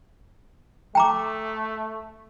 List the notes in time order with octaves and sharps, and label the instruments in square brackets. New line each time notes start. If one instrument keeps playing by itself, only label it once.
[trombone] A3 [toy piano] G5 A#5 D6